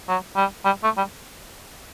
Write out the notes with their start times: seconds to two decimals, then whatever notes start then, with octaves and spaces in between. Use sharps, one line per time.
0.08 F#3
0.36 G3
0.65 G3
0.84 A3
0.97 G3